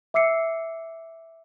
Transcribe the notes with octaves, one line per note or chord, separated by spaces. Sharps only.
E5 D6 E6 C7 C#7